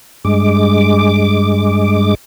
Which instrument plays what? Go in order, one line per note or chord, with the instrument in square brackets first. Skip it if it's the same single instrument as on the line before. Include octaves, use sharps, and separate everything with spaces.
[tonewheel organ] G2 G#3 D6